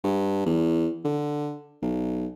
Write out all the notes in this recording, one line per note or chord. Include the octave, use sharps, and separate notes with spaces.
G2
E2
D3
B1